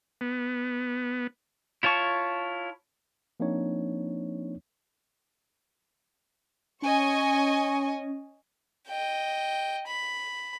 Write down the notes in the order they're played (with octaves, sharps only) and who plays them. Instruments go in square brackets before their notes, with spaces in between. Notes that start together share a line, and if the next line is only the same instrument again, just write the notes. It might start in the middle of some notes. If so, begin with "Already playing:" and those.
[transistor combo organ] B3
[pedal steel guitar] E4 F4 C#5 A5 C#6
[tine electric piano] F3 A#3 C4 D4 D#4 C#5
[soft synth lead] C#4 [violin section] D#5 G#5 C#6
[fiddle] D#5 G5
B5